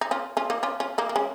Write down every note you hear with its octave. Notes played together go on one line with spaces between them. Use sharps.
D#4
C#4 F4
C#4 F4
A#3 D#4
C#4 F4
C#4 F4
A#3 D#4
A#3
G#3 C#4